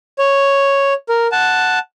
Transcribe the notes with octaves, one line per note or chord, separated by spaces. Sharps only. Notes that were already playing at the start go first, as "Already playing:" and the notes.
C#5
A#4
F#5 A5